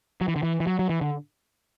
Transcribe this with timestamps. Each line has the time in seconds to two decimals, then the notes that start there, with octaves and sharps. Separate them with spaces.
0.21 F#3
0.28 E3
0.36 D3
0.43 E3
0.60 E3
0.67 F#3
0.79 F#3
0.89 E3
1.01 D3